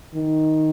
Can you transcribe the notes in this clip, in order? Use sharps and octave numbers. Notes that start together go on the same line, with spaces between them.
D#3